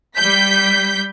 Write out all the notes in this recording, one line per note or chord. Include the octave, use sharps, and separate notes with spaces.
G3 G6 B6